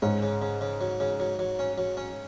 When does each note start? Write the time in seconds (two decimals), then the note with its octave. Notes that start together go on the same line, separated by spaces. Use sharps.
0.02 G#2 C#4
0.22 C#3
0.42 C#3
0.61 C#3
0.81 F#3
1.00 C#3
1.20 F#3
1.39 F#3
1.59 C#4
1.78 F#3
1.97 C#4